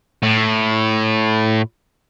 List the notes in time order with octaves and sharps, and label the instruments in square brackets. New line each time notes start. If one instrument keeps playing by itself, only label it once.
[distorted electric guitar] A2